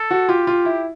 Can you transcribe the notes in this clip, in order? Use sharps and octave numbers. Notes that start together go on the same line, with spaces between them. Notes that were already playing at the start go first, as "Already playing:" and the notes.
Already playing: A4
F#4
F4 G4
F4
E4